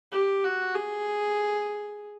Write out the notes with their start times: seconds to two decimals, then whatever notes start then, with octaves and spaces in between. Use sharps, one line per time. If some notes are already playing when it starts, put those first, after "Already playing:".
0.12 G4
0.44 F#4
0.75 G#4